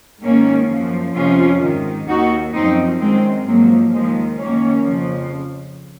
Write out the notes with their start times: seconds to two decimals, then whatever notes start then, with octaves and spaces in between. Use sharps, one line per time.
0.23 G#2 D#3 A#3 C#4
0.70 F#2 F3
1.15 F2 C3 F3 C#4 F4
1.62 G#2 D#3
2.08 D#2 D#3 D#4 F#4
2.54 F#2 F3 C4 D#4
3.01 F#2 D#3 G#3 C4
3.47 G#2 F3 F#3 A#3
3.93 D#2 D#3 F3 G#3
4.40 F#2 D#3 A#3 C#4
4.86 F2 C#3 F3